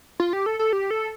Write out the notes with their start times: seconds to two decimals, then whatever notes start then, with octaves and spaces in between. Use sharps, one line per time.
0.20 F4
0.33 G4
0.46 A4
0.59 A4
0.73 G4
0.91 A4